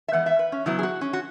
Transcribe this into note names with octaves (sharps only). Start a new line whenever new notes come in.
E5
E3 G#3 B3 F#5
E5
B4
C#4
C#3 F#3 B3 E4
G#4
F#4
C#4
F#4